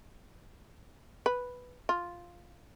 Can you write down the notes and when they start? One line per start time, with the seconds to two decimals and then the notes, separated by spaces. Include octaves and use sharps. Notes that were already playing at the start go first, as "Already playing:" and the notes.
1.26 B4
1.89 F4